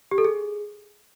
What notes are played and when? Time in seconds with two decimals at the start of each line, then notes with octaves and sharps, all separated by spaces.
0.11 G4
0.18 A4
0.25 G#4